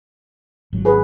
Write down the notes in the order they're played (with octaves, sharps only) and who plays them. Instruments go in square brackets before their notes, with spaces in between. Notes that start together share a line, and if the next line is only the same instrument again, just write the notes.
[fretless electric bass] G#1 F#3
[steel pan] G#4 B4